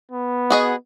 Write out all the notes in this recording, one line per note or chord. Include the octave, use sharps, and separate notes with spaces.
B3
F#4 G#4 D#5